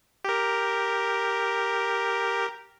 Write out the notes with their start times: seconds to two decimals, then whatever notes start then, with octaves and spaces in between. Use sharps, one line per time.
0.25 G4 A#4